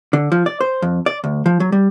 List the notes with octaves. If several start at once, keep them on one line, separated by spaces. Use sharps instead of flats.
D3
F3
D5
C5
F2
D5
D2
F3
F#3
G3